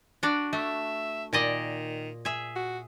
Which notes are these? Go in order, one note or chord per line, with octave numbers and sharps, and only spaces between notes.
D4 F#4 D5
A3 E5
A#2 D#3 D5 D#5
G#4 E5
F#4